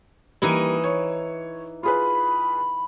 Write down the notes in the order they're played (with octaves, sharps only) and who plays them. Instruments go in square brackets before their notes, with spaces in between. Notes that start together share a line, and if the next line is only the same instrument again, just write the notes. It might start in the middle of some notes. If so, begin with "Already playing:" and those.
[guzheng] E3 D#4 E4 [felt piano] G3 A#3
[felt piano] C#5
[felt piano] F4 G#4 B4 [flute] B5